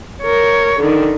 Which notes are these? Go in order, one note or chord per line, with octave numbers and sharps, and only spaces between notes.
A#4 C#5
D3 D#3